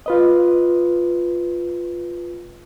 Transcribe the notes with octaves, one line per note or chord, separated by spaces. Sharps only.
F4 B4 D#5